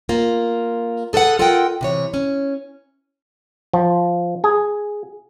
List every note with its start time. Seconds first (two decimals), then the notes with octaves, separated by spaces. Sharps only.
0.09 A#3 F4
1.13 G#4 A4 B4 D5 F#5
1.39 F4 A4 A#4 D#5 F#5 G5
1.81 C3 E3 C#5
2.14 C#4
3.73 F3
4.44 G#4